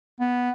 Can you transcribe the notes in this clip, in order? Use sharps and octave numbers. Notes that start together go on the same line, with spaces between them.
B3